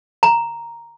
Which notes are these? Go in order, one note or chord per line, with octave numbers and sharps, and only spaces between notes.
A#5